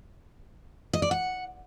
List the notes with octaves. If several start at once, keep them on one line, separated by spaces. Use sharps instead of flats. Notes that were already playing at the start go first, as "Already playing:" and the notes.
D#5
D5
F#5